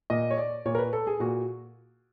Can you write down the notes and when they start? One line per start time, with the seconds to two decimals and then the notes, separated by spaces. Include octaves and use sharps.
0.10 A#2 D#5
0.31 C#5
0.38 D5
0.66 A#2 C#5
0.75 A#4
0.78 B4
0.93 A4
1.07 G#4
1.20 A#2 F#4